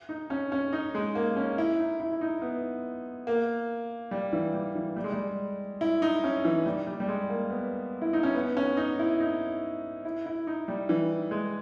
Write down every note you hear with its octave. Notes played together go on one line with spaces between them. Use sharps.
D#4
C#4
C#4
D#4
G#3
A#3
C#4
E4
D#4
E4
E4
D#4
B3
A#3
G3
E3
G3
E3
G3
G#3
G3
E4
D#4
C#4
E3
G3
G3
G3
G#3
A#3
B3
E4
D#4
C#4
B3
C#4
D#4
E4
D#4
E4
E4
D#4
G3
E3
G#3